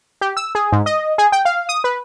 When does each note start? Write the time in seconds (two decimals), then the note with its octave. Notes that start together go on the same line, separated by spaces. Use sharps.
0.21 G4
0.37 E6
0.55 G#4
0.72 G#2
0.86 D#5
1.18 G#4
1.32 G5
1.45 F5
1.69 D#6
1.84 B4